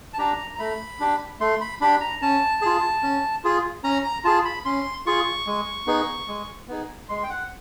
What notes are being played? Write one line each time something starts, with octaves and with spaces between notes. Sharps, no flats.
A5
D4 G4 A#5
A#5
A3 B5
D4 G4
A3 C6
B5
D4 G4 B5
A#5
C#4 A5
F4 G#4
C#4
F4 G#4
C#4 A#5
A#5
F4 G#4 A5
B5
C#4 C6
F4 G#4 C#6
G#3
B3 D#4 G#4
G#3
B3 D#4 G#4
G#3 C6
G5
F#5